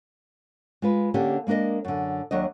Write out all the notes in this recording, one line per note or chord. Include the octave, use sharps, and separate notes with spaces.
G#3 F4 B4
D3 A#3 C#4 D4 G4
G#3 A#3 D4 A#4 D#5
F#2 D3
D#2 F#3 D4 D#5